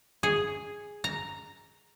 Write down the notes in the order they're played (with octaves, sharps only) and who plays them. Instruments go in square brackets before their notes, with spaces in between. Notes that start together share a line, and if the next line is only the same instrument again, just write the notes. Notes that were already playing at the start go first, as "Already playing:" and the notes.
[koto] G#4
A#5